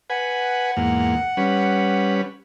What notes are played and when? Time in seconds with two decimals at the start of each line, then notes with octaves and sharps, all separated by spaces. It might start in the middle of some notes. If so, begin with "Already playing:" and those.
0.10 B4 F#5 G#5
0.77 E2 G#2 A#3
1.37 G3 C#4 B4